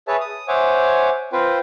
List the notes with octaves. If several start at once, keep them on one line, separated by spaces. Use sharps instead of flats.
G#4 B4 C#5 E5 A5
D#6
C5 C#5 E5 F#5 G#5 D6
C4 F4 B4 C5 G5